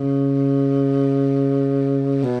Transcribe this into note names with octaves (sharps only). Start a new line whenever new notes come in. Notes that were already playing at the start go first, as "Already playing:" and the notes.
Already playing: C#3
B2